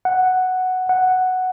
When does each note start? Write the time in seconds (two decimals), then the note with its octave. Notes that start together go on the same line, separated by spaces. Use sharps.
0.05 F#5
0.89 F#5